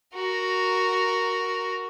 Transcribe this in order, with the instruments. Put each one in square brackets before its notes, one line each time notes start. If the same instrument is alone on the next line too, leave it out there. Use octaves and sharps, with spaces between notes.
[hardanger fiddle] F#4 A#4